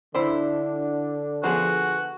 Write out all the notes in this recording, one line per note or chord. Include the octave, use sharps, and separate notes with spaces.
D3 D4 E4 C5
F3 B3 F#4 G#4